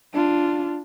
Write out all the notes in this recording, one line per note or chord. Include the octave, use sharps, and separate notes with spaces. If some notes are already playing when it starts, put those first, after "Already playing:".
D4 F4